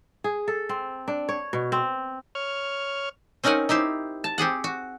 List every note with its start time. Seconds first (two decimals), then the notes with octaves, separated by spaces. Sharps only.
0.24 G#4
0.48 A4
0.69 C4
1.08 D4
1.29 C#5
1.53 B2
1.72 C4
2.35 C#5 F6
3.44 C4 C#4 D#4 A#4 F#5 G#5
3.69 D#4 E4 G4 C5
4.24 A5
4.38 C4 G4 G#4 F#5
4.64 F#4